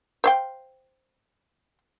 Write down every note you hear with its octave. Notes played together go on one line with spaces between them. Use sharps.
C5 F5 G5